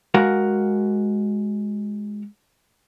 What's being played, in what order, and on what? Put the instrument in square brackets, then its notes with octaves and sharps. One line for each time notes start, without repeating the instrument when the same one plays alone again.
[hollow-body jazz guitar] G#3 F#4 A#4 F5 F#5